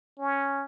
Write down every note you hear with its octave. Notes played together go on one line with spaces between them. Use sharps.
C#4